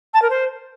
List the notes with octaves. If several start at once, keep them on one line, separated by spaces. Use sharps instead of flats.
A5
A#4
C5